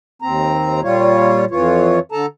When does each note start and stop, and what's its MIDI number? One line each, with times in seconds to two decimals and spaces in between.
0.22 0.81 39
0.22 0.81 60
0.22 0.81 82
0.83 1.45 46
0.83 1.45 55
0.83 1.45 65
0.83 1.45 73
1.51 1.99 41
1.51 1.99 52
1.51 1.99 65
1.51 1.99 73
2.12 2.26 50
2.12 2.26 69
2.12 2.26 81
2.12 2.26 82